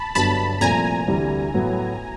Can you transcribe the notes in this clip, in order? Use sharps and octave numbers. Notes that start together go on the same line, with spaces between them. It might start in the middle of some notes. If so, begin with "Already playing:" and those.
Already playing: A5 B5
G1 G2 D3 F#3 B3 A5 B5
C2 A#2 F3 A3 C4 G#5 A#5
D2 C3 E3 G3
A2 F#3 B3